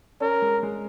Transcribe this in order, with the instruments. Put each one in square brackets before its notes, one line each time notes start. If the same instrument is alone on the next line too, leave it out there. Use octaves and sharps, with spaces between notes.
[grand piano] C#4 [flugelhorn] A#4
[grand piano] G#3
G#3